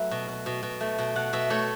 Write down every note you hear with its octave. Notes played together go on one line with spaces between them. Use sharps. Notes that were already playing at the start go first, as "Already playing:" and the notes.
Already playing: F#3 A3 B4 E5
B2
B2
B2
B2
A3
B2
B2 F#5
B2 E5
A3 C#5